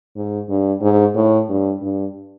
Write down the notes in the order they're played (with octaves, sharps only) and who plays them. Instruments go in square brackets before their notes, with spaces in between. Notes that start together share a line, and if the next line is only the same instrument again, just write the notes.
[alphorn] G#2
G2
G#2
A2
G2
G2